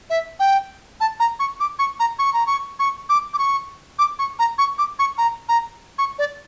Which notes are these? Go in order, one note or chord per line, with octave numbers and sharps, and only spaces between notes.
E5
G5
A5
A#5
C#6
D6
C#6
A#5
C#6
A#5
C#6
C#6
D6
D6
C#6
D6
C#6
A#5
C#6
D6
C#6
A#5
A#5
C#6
D5